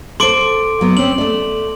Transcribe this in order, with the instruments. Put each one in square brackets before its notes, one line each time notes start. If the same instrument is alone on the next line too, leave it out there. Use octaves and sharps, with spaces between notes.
[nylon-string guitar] A4 C5 [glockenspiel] C6 D6 D7
[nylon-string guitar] F#3 B3
[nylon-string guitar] C4 C#4 [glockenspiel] F#7
[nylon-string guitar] A3 D5